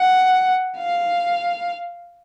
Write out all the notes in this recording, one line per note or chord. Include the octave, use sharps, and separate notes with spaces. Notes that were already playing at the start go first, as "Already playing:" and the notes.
Already playing: F#5
F5